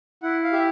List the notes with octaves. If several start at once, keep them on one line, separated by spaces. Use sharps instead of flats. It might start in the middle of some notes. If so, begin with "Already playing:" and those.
E4 F#5
F5
G4 E5